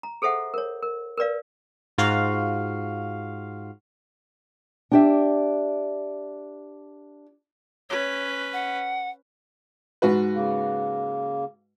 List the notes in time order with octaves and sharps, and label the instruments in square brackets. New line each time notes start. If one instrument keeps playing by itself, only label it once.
[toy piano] A#5
G#4 A4 C5 E5 F#5
A#4 C#5
A#4
A#4 B4 D5 F5
[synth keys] G#2 F4 F#4 F5
[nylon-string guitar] D4 G4 E5
[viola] C#4 B4 [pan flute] C#5
[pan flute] F#5
[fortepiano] G#2 F#4 B4
[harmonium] C#3 A#3